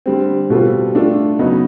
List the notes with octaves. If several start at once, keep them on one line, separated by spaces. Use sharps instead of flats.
D3 G3 C4
B2 G3 C4 F4 A4
A3 D4 F4 A4
C#3 F#3 B3 D#4